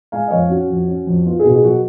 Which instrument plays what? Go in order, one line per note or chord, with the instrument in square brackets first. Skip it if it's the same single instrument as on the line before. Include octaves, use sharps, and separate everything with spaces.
[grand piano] G#3 F5 G#5
D#5
F2 C#5 F5
C#4 F#4
F2
C#4
F2
B3 F4
G#4
B2 F#4
G#4
F#3 F#4 A#4